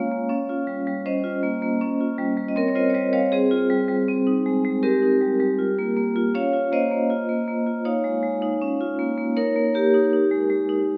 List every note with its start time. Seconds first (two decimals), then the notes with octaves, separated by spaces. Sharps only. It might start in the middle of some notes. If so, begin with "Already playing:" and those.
Already playing: G#3 A#3 C#4 F4 C#5 F5
0.11 A#3
0.29 C#4
0.49 F4
0.67 G3
0.87 G3
1.06 C#4 C5 D#5
1.24 F4
1.43 A#3
1.62 A#3
1.81 C#4
2.00 F4
2.18 G3
2.37 G3
2.48 D#5
2.56 C4 A#4 C#5
2.68 C#5
2.75 F4 C5 D#5
2.90 C#5
2.94 G3 C5 D#5
3.13 G3 C#5 F5
3.32 C4 G#4 C5
3.51 F4
3.70 G3
3.88 G3
4.08 C4
4.27 D#4
4.46 G#3
4.65 G#3
4.83 C4 G4 A#4
5.02 D#4
5.21 G3
5.40 G3
5.59 F4
5.78 A#3
5.96 A#3
6.16 F4
6.35 C#4 C#5 F5
6.53 F4
6.72 A#3 C5 D#5
6.91 A#3
7.10 F4
7.29 A#3
7.48 A#3
7.67 F4
7.85 D#4 C#5 F5
8.04 G#3
8.23 G#3
8.42 D#4
8.61 C#4
8.81 F4
8.99 A#3
9.18 A#3
9.36 D#4 A#4 C#5
9.56 A#3
9.74 A#3 G4 A#4
9.94 D#4
10.13 D#4
10.31 G#3
10.50 G#3
10.69 D#4